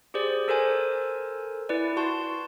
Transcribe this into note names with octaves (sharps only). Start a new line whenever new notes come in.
G4 G#4 C5 D5
A4 A#4 C5 G#5
E4 B4 D5
F#4 A5 C6